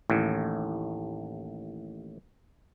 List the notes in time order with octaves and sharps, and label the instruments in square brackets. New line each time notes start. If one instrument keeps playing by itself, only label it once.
[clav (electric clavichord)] A1 D#2 A2